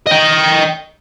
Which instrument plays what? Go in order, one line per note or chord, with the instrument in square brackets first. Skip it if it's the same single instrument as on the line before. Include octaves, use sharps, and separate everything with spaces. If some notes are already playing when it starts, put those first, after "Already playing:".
[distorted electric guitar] D#5 G5